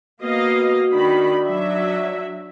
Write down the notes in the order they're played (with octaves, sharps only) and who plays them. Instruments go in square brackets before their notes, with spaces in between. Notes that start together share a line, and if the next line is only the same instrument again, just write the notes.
[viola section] A#3 D#5 F5 [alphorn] B3 [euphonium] F#4
[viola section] D#3 B5 [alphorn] D4
[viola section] F#3 E5